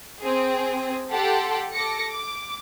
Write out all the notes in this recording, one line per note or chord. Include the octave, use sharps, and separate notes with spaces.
C4 G#4
G4 A4 F#5 G5 A5 C6
A4 D6 A#6 C#7
D6